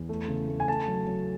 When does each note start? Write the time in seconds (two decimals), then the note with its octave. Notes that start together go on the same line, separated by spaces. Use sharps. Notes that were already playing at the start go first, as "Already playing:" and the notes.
Already playing: E2
0.09 A3
0.28 C#3
0.48 A3
0.60 G#5
0.68 A3 A5
0.88 F#3
1.07 F#3